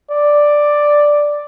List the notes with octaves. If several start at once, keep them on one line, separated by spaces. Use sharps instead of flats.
D5